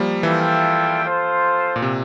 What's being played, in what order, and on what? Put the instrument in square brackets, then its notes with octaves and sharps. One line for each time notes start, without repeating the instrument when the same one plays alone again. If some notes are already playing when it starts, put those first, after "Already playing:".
Already playing: [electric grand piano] F3 G3 A#3
[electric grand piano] E3 [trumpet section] F4 A4 E5 G5
[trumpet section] F4 A4 C5
[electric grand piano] A#2
C3